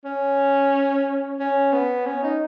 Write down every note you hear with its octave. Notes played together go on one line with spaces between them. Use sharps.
C#4
C#4
B3
C#4
D#4